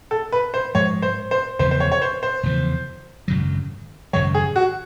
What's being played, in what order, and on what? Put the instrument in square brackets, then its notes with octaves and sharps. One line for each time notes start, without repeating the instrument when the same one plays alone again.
[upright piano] A4
B4
C5
[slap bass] G#2 F3 G#3 [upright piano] C#5
[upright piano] C5
C5
[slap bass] F1 E2 C#3 E3 [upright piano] C5
[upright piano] C5
C#5
C#5
C5
C5
[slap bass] F1 E2 C#3 E3
G#1 F#2 C#3 F#3
[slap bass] G#1 F#2 C#3 F#3 [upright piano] C#5
[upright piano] G#4
F#4